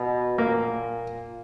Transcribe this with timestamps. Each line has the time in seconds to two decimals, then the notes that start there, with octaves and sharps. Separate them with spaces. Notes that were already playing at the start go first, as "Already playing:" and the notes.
Already playing: B2
0.38 A#2 A#3